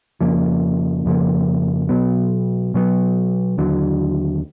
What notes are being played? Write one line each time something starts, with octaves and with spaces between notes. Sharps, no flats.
F2 C#3 F3 A#3
F2 C#3 F3 A#3
B2 F#3 B3
B2 F#3 B3
D#2 D3 F#3